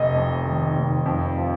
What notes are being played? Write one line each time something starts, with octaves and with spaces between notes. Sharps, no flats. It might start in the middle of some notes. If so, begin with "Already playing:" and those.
Already playing: F1 D#5
F2
D#3
F1
F2
F3